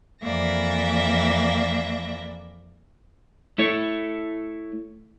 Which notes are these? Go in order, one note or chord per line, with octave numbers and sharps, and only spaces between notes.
F2 E3 A#3 D5 E5 A#6
A3 E4 A4 C#5